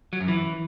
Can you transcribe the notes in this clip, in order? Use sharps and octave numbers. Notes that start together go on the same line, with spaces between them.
F#3
F#2
E3